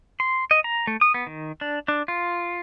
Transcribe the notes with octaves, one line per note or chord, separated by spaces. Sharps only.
C6
D#5
A#5
A3
D#6
B3
D#3
D4
D4
F4